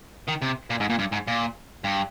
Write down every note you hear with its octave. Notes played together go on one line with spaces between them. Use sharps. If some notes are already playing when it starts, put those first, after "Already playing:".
D#3
C3
A#2
G#2
A#2
G2
G#2
A#2
G2